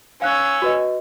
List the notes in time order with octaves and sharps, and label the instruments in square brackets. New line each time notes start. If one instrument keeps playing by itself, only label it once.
[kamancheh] C#4 E6 [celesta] F5 F#6
[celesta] F#4 B4 D#5